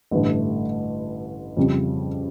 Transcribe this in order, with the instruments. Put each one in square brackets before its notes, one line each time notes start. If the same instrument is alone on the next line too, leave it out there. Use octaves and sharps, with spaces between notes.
[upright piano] A1 G2 D3 A3
F2 C#3 G3